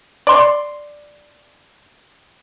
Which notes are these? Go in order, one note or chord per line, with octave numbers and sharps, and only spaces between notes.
D5 C6